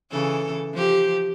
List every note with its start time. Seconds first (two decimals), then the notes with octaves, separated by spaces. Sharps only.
0.11 C#3 E3 A4
0.74 F3 G4